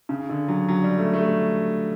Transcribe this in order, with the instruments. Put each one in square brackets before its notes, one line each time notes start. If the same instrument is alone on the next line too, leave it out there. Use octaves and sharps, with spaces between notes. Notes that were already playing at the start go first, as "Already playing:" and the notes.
[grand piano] C#3
D3
F#3
F#3
G3
A3
A3